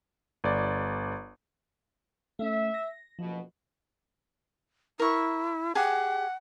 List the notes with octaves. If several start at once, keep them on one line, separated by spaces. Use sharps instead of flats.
G1 D5
A3 C#4 E5
A#6
F#1 B2 F3
E4 A#4 C#6
G4 G#4 F#5